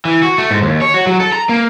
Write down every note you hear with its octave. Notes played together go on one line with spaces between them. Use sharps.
E3
F#4
A3
G#2
D#2
C#5
F#4
F#3
A4
A#5
A#3